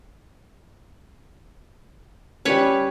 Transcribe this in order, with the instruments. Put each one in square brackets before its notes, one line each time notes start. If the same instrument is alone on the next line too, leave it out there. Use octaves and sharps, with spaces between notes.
[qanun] G3 C#4 [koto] B4 C#5